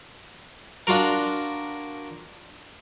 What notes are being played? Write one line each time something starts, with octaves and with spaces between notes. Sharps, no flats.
D4 F4 F#4 A#4